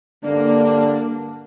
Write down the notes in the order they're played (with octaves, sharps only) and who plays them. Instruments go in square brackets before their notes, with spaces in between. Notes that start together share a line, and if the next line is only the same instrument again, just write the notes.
[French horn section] G2 D3 D4 [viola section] A#3